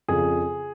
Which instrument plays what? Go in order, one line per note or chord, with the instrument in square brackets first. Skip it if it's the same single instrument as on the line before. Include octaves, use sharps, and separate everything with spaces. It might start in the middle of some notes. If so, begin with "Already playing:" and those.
[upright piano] F2 C#3 F3 G#4